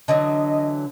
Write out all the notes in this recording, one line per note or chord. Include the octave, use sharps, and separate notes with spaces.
D3 E3 F#3 D#5